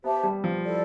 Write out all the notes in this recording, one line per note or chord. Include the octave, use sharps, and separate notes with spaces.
B3 G4 C5 E5 A5
G3
F3
E4 A4 D5